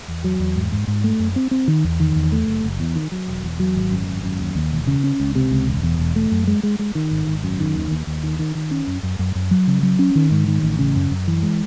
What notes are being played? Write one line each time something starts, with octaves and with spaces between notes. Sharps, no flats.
E2
F#3
E2
G#2
G#2
G#2
A3
F#2
C4
C4
D#3
E2
D#3
E2
A3
F#1
F#1
E2
D#3
F#3
E1
E2
F#3
G#1
F#2
G#1
F#2
D#2
D#2
E1
C#3
C#4
C#2
C3
C#2
E1
E2
E1
A3
F#2
G#3
G#3
G#3
D#3
G#1
G#1
F#2
D#3
D#2
D#2
D#2
D#3
D#3
D#3
C#4
F#2
F#2
F#2
F#2
F#3
C#3
F#3
C#4
D#3
G#2
D#3
A1
C#3
F#2
F#2
E3
G#3